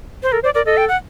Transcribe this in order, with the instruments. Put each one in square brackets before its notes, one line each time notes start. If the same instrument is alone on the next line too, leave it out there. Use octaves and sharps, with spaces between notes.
[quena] C5
[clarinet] A4 [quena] A#4
[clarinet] C5 [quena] D5
[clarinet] A#4 [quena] D5
[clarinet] A4 [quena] D#5
[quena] G5
F#5